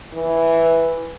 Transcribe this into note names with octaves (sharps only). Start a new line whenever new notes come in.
E3